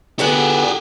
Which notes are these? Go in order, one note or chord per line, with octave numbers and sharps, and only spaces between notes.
D3 B3 G4 G#4 F#5